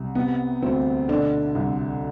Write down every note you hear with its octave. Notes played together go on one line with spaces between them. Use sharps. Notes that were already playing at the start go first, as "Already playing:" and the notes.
Already playing: C2
C3 B3
D2 C4
B2 D3 D4
C2